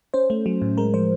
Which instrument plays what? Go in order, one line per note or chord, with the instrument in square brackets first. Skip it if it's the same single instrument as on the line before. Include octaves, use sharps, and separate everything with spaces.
[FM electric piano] C#4 C5
A3
F#3
A2
G#3 A#4
F3 C5